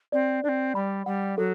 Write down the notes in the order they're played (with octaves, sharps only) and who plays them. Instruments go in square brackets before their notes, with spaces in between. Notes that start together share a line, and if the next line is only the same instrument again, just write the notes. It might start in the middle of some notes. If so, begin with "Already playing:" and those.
[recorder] C4 [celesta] D5
[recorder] C4 D4 [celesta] D5
[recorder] G3 [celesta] B5
[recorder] G3 [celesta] F#5
[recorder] F#3 [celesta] A4